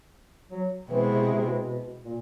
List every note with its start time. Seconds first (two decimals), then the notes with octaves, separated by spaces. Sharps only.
0.51 F#3
0.90 B2 E3 G#3 C4 E4
1.09 C3
1.27 C3
1.47 B2
1.66 B2
2.05 A#2